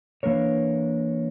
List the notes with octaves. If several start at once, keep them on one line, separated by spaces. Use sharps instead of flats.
E3 A#3 D4 A#4 C#5